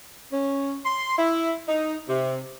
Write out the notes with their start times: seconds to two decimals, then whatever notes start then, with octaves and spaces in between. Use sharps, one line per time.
0.32 C#4
0.85 C6
1.18 E4
1.68 D#4
2.08 C3